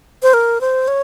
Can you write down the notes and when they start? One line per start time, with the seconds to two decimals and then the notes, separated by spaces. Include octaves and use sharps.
0.23 C5
0.34 A#4
0.61 C5
0.88 C#5